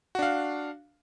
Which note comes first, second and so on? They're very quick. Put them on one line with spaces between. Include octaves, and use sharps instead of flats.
F#4 D4 F5